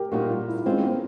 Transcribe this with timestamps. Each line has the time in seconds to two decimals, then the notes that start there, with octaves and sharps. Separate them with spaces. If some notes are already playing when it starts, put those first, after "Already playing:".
Already playing: G4 A#4
0.12 A#2 G3 A#3 D#4 F#4
0.30 F4
0.48 E4
0.65 D#3 G#3 C4 C#4 F4
0.83 B3